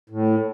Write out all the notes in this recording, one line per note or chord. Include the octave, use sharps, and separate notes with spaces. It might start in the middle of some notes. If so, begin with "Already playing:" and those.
A2